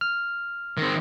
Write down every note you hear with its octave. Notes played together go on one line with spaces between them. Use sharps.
F6
D#3 C4